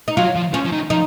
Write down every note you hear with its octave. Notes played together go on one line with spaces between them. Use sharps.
D#4
F#3 F4
F3
F3 C#4
F3
D#3
F3 D#4